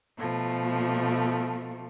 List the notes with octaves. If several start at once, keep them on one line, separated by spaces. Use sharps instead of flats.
B2 F3 A3